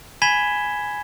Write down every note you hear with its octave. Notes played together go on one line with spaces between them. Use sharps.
G#5 B5 G#6 B6 E7 G7